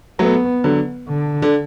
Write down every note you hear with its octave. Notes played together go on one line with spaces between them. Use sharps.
F#3 A3 B3
D3 F#3
D3
D3